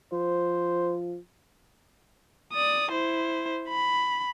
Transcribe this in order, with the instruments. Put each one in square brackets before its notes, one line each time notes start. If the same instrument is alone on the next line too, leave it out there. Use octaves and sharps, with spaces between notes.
[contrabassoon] F3 [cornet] C5
[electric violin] D5 D#6
E4 C5
B5